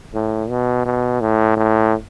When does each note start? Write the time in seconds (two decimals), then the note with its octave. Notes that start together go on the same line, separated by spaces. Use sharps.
0.14 A2
0.50 B2
0.85 B2
1.21 A2
1.57 A2